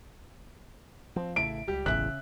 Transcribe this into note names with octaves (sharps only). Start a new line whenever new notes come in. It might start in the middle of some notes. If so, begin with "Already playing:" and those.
F3 C4
A1 C#3 A3 E4 D7
D1 C#2 G3 G4
E1 A1 E2 C#3 C#4 E5 F#6